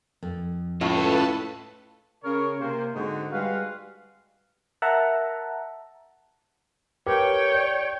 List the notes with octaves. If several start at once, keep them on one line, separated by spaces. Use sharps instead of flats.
F2
A2 C#4 F4 A4 B4 A5
C#3 A#4 C#5
C3 A#3 C5
G#2 D3 C4 D#4 F#4
G3 G#3 F#4 B4 F5
A#4 E5 F#5 A5 A#5
G4 A#4 B4 C#5 G5
D5